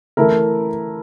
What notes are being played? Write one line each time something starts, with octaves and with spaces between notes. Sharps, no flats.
E3 A3 E4 A#4